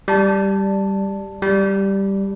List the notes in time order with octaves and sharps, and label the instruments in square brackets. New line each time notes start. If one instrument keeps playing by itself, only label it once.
[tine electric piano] G3 [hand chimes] D5 A5
[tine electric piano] G3